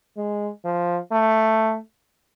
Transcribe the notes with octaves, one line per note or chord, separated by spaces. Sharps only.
G#3
F3
A3